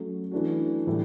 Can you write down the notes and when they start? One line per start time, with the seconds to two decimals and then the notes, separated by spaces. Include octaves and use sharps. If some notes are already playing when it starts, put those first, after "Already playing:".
Already playing: F#3 A3 C#4
0.32 E3 A3 D4 F#4
0.87 A2 E3 G3